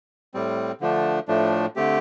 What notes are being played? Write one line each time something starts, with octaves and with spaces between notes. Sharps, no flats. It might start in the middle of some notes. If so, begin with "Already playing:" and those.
A2 G3 C4
D3 F3 A3 D4
A2 F3 A3 D4
D3 A3 C4 G4